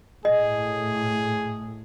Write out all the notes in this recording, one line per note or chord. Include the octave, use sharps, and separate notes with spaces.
A2 G#4 D#5